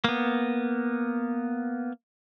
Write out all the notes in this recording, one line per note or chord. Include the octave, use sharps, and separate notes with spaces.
A#3 B3